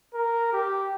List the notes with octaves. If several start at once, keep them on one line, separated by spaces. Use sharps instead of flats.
A#4
G4